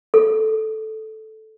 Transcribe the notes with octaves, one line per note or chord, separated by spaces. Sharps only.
A4